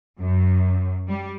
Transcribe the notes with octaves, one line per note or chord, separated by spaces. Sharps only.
F#2
G3